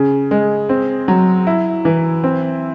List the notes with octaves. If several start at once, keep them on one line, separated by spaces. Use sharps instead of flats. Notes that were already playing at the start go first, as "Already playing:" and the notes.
Already playing: C#3
G#3
C4
F#3
E4
E3
C4